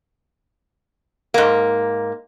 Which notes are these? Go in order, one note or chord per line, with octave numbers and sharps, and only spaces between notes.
G#2 A#3